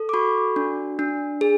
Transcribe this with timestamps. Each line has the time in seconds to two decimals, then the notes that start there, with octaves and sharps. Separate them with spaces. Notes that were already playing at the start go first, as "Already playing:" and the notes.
Already playing: A4
0.09 D6
0.14 F#4 B5 C#6
0.56 D4
0.99 D4
1.41 G#4